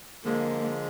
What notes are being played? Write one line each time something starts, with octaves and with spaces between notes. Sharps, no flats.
D3 F3 G#3 A#3